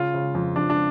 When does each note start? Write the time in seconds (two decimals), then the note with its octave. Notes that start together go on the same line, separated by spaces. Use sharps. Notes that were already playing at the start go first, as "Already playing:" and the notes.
Already playing: C#3 F4
0.14 C#3
0.35 F2
0.56 F2 D4
0.70 D4